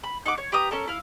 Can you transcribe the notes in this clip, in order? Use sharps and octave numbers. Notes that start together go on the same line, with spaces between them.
B5
D#4 F#5 D6
C#5
G4 B4 A#5 D#6
C#4 A4 A#4
E4 F5